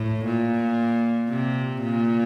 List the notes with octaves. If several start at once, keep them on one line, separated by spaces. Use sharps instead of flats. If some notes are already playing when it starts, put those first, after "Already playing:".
Already playing: A2
A#2
C3
A#2